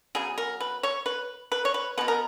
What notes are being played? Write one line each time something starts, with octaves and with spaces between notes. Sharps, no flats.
C#3 F#3 B3 G#4
A#4
B4
C#5
B4
B4
C#5
B4
B2 G#3 B3 B4
A#4